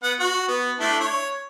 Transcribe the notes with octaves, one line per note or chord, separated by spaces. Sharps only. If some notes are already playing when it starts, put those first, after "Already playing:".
B3 F#5
F#4
B3
A3 D4 E4
C#5